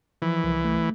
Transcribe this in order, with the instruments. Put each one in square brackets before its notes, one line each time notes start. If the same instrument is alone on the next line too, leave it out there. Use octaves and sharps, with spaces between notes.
[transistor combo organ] E3 [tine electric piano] F3
[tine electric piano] C2
A3